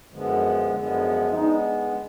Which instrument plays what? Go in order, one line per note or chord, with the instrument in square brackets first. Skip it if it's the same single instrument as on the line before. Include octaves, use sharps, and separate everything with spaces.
[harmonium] F#2 D3 F3 G#3 B3
F#2 D3 F3 G#3 B3
[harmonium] D3 G#3 B3 [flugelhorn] D#4